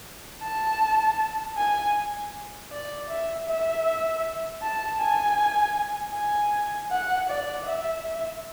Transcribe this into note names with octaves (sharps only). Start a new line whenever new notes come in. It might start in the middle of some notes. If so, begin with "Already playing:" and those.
A5
G#5
D5
E5
E5
A5
G#5
G#5
F#5
D5
E5